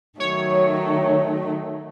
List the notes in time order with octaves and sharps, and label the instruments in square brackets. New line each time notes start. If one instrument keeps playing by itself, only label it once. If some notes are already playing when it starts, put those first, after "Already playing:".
[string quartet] D#3 F#3 A3 [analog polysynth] C#5